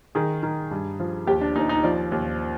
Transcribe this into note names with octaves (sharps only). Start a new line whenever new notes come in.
D#3 G#4
D#3
G2
F3
D#2 G4
D4
D#2 D#4
D#4
F3 D5
D#2